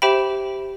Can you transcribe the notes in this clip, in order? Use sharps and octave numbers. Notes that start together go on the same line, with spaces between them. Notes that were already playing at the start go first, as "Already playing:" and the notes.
G4 C5 E5 G5 B5